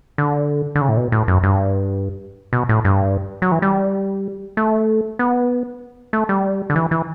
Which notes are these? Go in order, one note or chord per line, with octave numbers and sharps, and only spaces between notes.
D3
D3
C#3
A2
B2
A2
F#2
G2
B2
A2
G2
F#3
E3
G3
A3
B3
A3
G3
D3
E3
E3